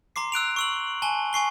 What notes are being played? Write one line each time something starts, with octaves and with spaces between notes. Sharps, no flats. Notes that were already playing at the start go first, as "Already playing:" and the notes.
A#5 C6 D6 C7
E6 F#6 D7 F7
C#6 E6 F#7
G#5 A5 G7
G#5 C#6 C7 G7